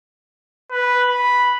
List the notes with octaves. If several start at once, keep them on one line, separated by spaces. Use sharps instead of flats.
B4
B5